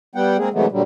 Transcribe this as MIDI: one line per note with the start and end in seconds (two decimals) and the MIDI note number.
0.15 0.37 55
0.15 0.37 59
0.15 0.37 78
0.15 0.37 79
0.38 0.49 56
0.38 0.49 58
0.38 0.49 60
0.38 0.49 68
0.53 0.66 48
0.53 0.66 52
0.53 0.66 54
0.53 0.66 56
0.53 0.66 57
0.53 0.66 59
0.72 0.82 46
0.72 0.82 50
0.72 0.82 54
0.72 0.82 55